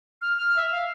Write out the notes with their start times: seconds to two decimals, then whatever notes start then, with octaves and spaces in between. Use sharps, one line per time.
0.21 F6
0.37 F6
0.56 E5
0.72 F5